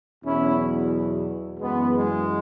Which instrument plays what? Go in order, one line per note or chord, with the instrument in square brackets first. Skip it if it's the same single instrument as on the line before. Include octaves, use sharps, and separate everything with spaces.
[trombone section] E2 B2 F#3 C#4 E4
F#2 E3 G#3 B3
G#3